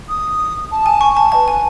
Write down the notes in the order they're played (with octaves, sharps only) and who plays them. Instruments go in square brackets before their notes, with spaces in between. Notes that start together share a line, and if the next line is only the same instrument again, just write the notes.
[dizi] D#6
A5
[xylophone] G#5
[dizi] G#5 [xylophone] C#6
[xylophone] A5
[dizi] B4 [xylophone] A5
[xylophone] G#5